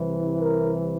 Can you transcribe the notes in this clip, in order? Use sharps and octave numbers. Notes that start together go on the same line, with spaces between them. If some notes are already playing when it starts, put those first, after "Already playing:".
Already playing: C2 C3 E3
A#4